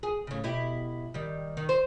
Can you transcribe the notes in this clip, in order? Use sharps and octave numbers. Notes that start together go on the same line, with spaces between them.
G#4
A2 C#3
B2 E4 G4
D#3 G3
D#3
C5